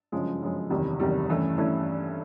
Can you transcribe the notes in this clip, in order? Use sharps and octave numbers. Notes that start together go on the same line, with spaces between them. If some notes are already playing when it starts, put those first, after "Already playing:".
G1 F#2 C#3 F3 G#3
G1 F#2 C#3 F3 G#3
F#1 E2 C3 D#3 G3
F#1 E2 C3 D#3 G3
G2 E3 A3 C#4 E4
G2 E3 A3 C#4 E4